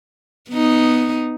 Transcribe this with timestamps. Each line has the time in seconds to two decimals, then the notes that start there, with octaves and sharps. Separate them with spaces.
0.50 B3 D#4